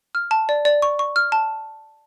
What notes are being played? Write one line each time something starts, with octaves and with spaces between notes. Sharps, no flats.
F6
A5
D5
D5
C#6
C#6
F6
A5